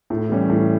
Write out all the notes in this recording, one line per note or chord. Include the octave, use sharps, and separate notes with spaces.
A2
E3 G3 C#4
A2